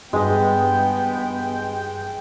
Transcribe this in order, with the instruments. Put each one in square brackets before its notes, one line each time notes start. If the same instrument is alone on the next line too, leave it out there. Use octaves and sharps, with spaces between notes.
[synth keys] G2 [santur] G#3 D#5 [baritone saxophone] B3 [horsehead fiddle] G5